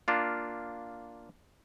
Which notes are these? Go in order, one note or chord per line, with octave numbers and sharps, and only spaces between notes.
A#3 D4 F4